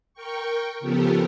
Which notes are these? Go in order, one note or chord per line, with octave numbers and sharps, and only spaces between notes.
A#4 G5 C#6
C#3 F3 B3 G4 A4 A#4